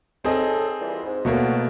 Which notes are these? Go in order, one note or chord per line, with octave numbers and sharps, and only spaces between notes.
F#2 D#3 C4 G#4 A4 D#5
A#2 E3 G3
G#2
B2 F#3 A3 A#3 E4 F#4